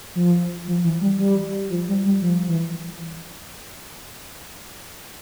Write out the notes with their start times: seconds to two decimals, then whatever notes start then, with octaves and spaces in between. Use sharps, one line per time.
0.15 F3
0.68 F3
0.84 E3
1.01 G3
1.19 G3
1.70 F3
1.88 G3
2.05 G3
2.22 F3
2.48 E3